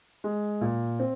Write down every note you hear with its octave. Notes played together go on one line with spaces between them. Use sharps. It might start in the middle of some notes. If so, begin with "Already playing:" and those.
G#3
A#2
C4